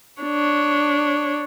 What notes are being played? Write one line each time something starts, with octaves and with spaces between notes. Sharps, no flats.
D4 C#5